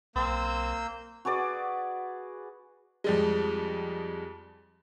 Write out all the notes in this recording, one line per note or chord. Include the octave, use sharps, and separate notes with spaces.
B1 A#3 C4 E6 G6
F#4 G#4 B4 D5
F2 G3 G#3